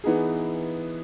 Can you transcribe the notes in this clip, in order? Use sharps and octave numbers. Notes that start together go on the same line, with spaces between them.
E3 B3 D#4 G#4